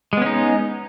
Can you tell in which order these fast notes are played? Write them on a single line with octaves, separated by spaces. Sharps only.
G#3 B3 C#4 D#4